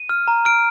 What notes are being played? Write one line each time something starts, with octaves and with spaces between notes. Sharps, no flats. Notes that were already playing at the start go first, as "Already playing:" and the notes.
Already playing: D#7
F6
A#5
F6 D7